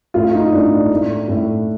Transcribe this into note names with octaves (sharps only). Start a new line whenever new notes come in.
A2 A3 F4
D#4
A2 A3 D4
A2 A3
A2 A3